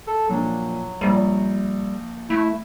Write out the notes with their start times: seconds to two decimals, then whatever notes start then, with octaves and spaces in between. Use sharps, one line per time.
0.07 A4
0.29 A#2 F3 F#3 D4
1.01 A#1 G3
2.30 A3 E4